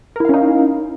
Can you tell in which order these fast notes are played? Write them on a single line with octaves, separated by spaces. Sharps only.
A#4 E4 F5 C#4 D#4